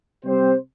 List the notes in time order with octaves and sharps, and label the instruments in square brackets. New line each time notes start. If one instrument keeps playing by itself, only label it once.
[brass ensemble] C3 G3 C4 G4 C5